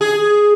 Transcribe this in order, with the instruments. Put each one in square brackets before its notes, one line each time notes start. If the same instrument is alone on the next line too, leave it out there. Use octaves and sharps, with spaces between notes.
[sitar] G#4